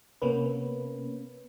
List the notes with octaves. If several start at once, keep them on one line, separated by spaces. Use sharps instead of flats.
C3 A#3 B3 C#4 B4